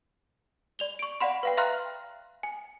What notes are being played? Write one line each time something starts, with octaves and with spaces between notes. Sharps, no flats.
D5 F7 G7
C#6 D7
D5 F5 F#5 B5 C6
B4 F5 G5
E5 F5 A#5 C6 F6 F#6
G#5